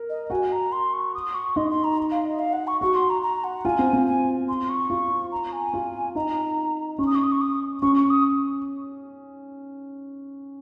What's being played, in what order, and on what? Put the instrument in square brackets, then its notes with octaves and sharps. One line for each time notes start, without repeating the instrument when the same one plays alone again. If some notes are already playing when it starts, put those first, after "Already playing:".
Already playing: [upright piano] A#4
[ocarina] D#5
[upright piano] F#4 [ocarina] G#5
[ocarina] A#5
C6
C#6
D#6
C#6
[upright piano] D#4 [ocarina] C6
[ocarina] C6
A#5
F5
D#5
F5
F#5
C#6
[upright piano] F#4 [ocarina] C#6
[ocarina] C6
A#5
A#5
F#5
[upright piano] F4 [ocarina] G#5
[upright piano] C4
C4
[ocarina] G#5
C6
C#6
[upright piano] F4
[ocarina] A#5
G#5
[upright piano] F4
[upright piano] D#4 [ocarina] A#5
[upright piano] C#4 [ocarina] C#6
[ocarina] D#6
C#6
D#6
C#6
D#6
[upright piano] C#4 [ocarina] C#6
[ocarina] C#6
D#6